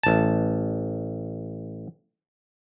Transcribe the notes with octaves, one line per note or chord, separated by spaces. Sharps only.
A1 A5